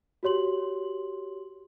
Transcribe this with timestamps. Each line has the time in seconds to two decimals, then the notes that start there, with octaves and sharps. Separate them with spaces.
0.23 F#4 G4 C#5 C6 F#7